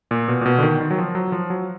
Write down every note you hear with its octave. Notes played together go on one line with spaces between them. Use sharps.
A#2
B2
A#2
B2
D3
D#3
D#3
F#3
F3
F#3
F3
F#3